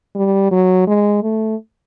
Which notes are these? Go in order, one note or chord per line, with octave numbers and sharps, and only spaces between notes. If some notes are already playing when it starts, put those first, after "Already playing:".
G3
F#3
G#3
A3